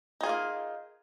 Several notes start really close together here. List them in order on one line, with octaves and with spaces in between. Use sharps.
D#4 G#4 F4 A#3